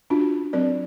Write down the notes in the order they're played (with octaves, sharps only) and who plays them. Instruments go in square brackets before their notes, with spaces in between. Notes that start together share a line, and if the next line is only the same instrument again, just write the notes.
[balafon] C#4 D4 F4 F#4
F#3 C4 A#4 D5